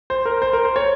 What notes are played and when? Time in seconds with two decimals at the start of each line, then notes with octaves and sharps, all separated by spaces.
0.10 C5
0.25 A#4
0.42 C5
0.53 A#4
0.65 C5
0.76 C#5